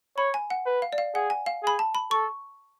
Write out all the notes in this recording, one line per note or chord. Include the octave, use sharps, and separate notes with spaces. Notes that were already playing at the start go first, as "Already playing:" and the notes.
C#5 B5
G#5
F#5
B4
F5
D5
F5
G#4 F#5
G#5
F5
G#4 B5
A5
B5
A4 C#6